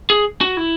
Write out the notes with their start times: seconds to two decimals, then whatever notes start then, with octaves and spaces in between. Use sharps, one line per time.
0.10 G#4
0.41 F#4
0.57 E4